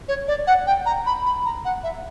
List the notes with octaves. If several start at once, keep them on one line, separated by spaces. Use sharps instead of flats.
C#5
D5
F#5
G5
A#5
B5
B5
A#5
F#5
E5